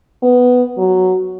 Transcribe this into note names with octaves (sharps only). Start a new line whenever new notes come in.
B3
F#3